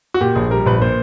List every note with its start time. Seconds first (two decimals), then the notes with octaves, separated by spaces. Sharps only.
0.14 F#4
0.21 A#2 G4
0.35 A#1 G#4
0.51 G3 A#4
0.66 A#1 B4
0.82 A#2 C5